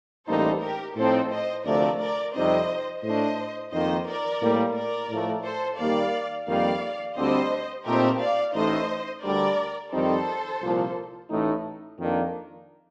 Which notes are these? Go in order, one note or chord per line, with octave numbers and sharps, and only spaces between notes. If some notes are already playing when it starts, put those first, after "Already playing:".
A1 A2 G3 A#3 D#4 A4 C5
G4 A#4
A2 F3 C4 D#4 A4 C5
C5 D#5
D2 C3 F3 A3 A#4 D5
A#4 D5
F2 C3 G3 C4 D#4 C5 D#5
A2 A3 D4 C5 D#5
F2 D#3 A#3 D#4 C5 D#5
A#4 D5
A2 G3 A#3
A#4 D5
A2 F3 A3
A4 C5
D#2 D#3 G3 A#3 D5 F5
F2 D#3 G3 A#3 D5 F5
D2 D3 G3 C4 C5 D#5
A#2 A3 C4 D#4 G4 A#4
D5 F5
A1 A2 A3 D#4 C5 D#5
D2 D3 G3 A#4 D5
F2 D#3 G3 C4 D#4 A4 C5
C2 A#2 F3 A#3
A1 A2 A3 D#4
F2 D#3 A#3 D4